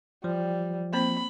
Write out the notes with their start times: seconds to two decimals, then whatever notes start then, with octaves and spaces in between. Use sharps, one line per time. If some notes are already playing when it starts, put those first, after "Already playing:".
0.24 F3 G3
0.93 A#3 C4 C5 B5